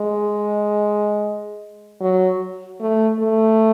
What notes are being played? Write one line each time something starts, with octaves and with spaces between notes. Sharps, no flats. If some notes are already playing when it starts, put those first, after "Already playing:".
Already playing: G#3
F#3
A3
A3